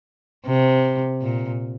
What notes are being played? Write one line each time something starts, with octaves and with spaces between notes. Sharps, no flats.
C3
A#2